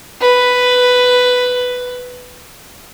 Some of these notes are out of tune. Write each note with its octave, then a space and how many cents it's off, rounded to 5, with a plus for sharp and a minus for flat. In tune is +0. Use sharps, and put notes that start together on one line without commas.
B4 +5